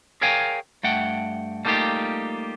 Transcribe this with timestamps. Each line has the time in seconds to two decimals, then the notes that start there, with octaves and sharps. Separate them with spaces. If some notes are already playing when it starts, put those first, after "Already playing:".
0.21 G#4 A#4 C#5 F5 G5 G#5
0.83 G2 A3 F#5 G5
1.65 G3 A3 A#3 D#4 F4 G4